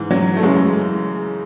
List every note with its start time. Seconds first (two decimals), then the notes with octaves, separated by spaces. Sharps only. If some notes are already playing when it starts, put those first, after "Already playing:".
Already playing: G#2 E3
0.11 F#3
0.37 A3
0.43 F#2 C#3 E3 G#3